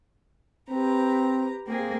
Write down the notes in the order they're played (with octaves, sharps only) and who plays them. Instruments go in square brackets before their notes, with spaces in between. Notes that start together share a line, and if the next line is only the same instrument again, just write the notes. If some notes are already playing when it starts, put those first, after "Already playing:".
[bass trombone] C4 [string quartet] G4 B4 A#5
[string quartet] A#3 C4 G#4